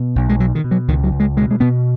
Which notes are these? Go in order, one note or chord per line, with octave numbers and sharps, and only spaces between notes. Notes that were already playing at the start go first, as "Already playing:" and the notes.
Already playing: B2
B1
G#3
B2 F#3
D#3
B2
F#3
C#2 D#3
F#3
C#2
G#3
B2 G#3
G#3
B2 B3